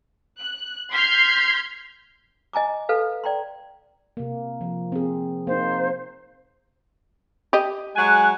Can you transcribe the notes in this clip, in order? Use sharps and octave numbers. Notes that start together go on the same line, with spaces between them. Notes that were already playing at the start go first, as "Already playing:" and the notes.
F#6
C6 F6 G6 G#6 B6 C7
D#5 G#5 A#5 D6
A4 B4 F5
D5 G5 A#5 C6
C3 A#3
F3
C4 G#4
A#3 D#4 C5
G4 D#5
F#3 G#3 G#5 F#6